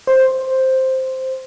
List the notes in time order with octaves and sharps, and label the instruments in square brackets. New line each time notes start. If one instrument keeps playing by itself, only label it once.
[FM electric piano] C5